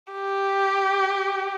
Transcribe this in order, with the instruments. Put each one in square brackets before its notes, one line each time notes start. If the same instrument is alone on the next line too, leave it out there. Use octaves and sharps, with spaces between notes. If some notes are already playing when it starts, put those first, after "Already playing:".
[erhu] G4